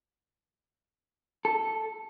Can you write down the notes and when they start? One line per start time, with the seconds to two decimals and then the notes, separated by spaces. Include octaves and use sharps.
1.45 A4